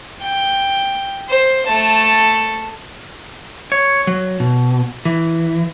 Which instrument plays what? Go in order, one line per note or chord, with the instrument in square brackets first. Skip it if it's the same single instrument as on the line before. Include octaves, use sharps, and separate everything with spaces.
[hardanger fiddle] G5
C5
A3 A5
[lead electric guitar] C#5
F#3
B2
E3